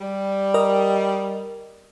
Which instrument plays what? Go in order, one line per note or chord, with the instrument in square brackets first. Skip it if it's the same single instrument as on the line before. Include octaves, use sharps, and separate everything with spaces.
[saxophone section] G3
[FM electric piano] A#4 D#5